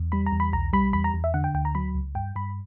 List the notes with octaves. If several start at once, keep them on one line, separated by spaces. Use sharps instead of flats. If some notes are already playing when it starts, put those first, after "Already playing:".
Already playing: E2
G3 B5
A#5
E2
B5
B1 A#5
G3 B5
E2 B5
A#5
E2
E5
D3 F#5
G5
D2 G5
A#5
F#3 B5
C#2
G2 G5
G2 B5